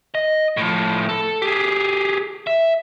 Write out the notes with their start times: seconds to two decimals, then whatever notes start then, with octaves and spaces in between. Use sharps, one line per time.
0.15 D#5
0.57 A2 F3
1.09 A4
1.42 G4 G#4
2.47 E5